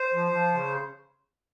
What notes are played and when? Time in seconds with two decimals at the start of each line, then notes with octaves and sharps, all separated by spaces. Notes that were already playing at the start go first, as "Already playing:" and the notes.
Already playing: C5
0.13 F3
0.32 F3
0.52 C#3